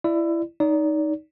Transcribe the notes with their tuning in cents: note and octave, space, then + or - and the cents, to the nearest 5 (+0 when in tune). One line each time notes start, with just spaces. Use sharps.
E4 +20 D5 +20
D#4 +0 D5 -35